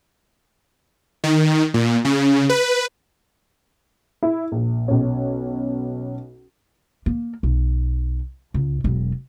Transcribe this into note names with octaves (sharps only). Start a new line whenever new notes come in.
D#3
A#2
C#3
B4
E4
A#1
B1 C#4
A#3
B1
C#2
E1 F#3